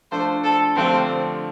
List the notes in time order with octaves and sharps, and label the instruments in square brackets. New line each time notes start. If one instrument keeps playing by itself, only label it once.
[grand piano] F3 A3 D4 A4 [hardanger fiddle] C5
[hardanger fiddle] A4
[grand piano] D3 F3 A3 D4 G4 [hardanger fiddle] C4